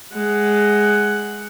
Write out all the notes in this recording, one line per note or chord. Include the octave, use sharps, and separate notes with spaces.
G#3 F#5